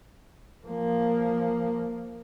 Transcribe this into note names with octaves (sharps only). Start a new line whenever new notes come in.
F3 A#3